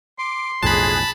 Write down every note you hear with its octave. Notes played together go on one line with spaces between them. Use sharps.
C6 D6
B1 F2 A2 G#4 A5 B5 F#6